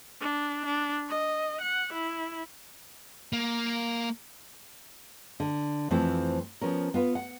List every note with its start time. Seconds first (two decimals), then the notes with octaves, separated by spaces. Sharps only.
0.21 D4
0.66 D4
1.09 D#5
1.62 F#5
1.93 E4
3.33 A#3
5.40 D3
5.90 F2 E3 F3 A3 C4
6.61 F3 B3 C#4 A#4
6.94 B3 F4 B4
7.15 F#5